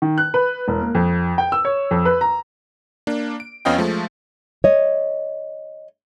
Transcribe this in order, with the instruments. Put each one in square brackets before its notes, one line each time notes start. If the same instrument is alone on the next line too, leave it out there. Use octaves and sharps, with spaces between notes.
[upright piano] D#3
F#6
B4
E1
A#3
F2
G5
E6
C#5
F2
B4
A#5
[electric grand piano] A#3 D4
D7
F2 B3 C#4 D#5 F5 G5
F3 G#3 A3
[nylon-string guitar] C#5 D#5